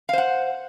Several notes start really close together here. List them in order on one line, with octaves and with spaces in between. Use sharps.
F5 C5 F#5